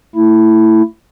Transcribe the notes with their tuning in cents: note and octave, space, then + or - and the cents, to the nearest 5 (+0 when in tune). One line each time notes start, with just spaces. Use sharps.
A3 +30 E4 +0